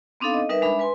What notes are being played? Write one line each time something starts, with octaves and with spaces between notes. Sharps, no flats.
B3 C4 D4 D#4 A4 F5
D#5
G3 D#4 A#4 B4 E5
G#3 D4 E5 B5
B4 G#5 C6